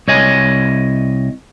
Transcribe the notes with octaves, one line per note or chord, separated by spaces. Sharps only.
C2 C#5 D#5 G#5